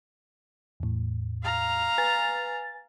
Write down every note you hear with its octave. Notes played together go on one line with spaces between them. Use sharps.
E2 A2
F5 A#5
B4 G#5 A6